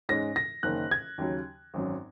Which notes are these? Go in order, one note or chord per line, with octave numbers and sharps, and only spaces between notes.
G#2 G#3 C#4 A#6
A#6
F#1 F#2 D#3 A#3 C#4 F#6
G#6
D#2 C#3 F#3
G#1 F#2 F#3